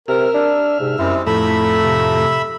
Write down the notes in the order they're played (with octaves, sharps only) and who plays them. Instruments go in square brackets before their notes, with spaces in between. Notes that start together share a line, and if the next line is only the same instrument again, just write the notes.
[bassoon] C3 [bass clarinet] A#4 [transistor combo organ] E5 F6
[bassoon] D4
[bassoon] G#2 [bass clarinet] C3
[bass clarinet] F#2 [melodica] G3 G#3 C4 [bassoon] E4
[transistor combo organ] F2 A2 A#5 [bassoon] A3 [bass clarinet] E4 [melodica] E5 B5 E6
[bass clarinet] C3